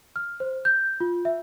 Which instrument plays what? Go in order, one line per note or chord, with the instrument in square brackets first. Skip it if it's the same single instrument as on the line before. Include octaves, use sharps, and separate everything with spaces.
[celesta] F6
C5
G6
F4
E5